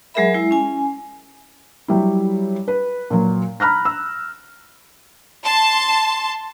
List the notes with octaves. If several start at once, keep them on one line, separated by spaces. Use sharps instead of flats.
F#3 G#3 G#4 A#4 E5 B5
G#3 E4
C#4 G#5
F#3 G3 E4
B4
A#2 F#3
A#5 B5 F6 F#6 A#6
E6
A5 C6